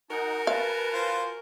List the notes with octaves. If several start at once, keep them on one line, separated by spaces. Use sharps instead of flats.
D#4 F#4 A#4 F#5 G#5
B4 F5 A5
F4 C5